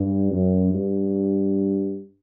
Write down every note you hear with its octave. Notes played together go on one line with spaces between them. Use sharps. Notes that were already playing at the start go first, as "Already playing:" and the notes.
Already playing: G2
F#2
G2